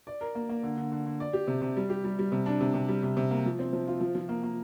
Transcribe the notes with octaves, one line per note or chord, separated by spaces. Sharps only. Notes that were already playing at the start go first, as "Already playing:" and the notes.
D5
A#4
A#3
A#3
D3
D3
D3
D3
D5
G4
C3
C3
G3
G4
G3
G3
C3
D4
C3
C3
G3
C3
C3
A#3
F3
C4
F3
F4
F3
F3
A#3
A#3